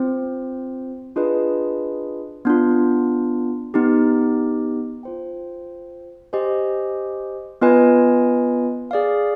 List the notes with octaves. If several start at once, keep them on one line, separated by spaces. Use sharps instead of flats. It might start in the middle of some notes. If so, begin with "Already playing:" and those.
Already playing: C4 F4 C5
D4 F4 G#4 B4 D#5
B3 D4 F4
B3 D#4 G4
F4 C5 G5
G4 C5 D#5 G#5
B3 F4 B4 D#5 G#5
G#4 D5 F5